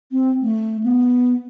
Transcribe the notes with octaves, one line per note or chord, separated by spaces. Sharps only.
C4
A3
B3